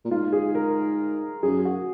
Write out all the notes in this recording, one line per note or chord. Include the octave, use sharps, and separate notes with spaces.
A#2
G#2 F4
G#4
A#4
F#2 G#4
F#4